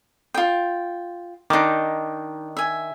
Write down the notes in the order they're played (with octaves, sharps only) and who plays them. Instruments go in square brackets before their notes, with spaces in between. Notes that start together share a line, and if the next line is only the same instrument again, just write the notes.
[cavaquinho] F4 G5
[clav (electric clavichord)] D#3 D4 [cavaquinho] D#4 D6
[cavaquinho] E5 G#5